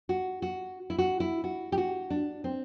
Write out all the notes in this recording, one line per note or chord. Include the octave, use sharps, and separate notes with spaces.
F#4
F#4
E4
F#4
E4
F#4
G4
F#4
D4
C4